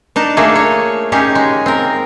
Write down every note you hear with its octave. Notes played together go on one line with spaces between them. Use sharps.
D4 D#4 A5
A3 A#3 D4 F4 G#4 A4
C#5
C#4 D#4 G4 G#4
G#3
C4 A#4